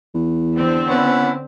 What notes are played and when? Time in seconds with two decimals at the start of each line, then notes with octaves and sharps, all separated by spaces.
0.15 E2
0.57 D3 C4
0.88 B3 C#4 E4